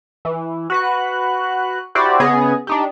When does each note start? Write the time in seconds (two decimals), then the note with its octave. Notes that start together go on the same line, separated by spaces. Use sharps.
0.25 E3
0.70 F#4 B4 F#6
1.95 E4 F#4 G4 C5 D5
2.20 C#3 B3 G#4 D#5
2.67 D4 D#4 G4